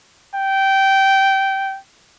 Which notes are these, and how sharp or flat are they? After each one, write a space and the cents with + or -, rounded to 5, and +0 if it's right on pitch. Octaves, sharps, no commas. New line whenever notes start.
G5 -15